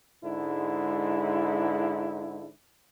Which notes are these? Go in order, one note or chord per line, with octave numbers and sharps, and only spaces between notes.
G#2 D3 G#3 E4